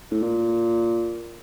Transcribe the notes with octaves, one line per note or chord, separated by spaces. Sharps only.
A2
A#2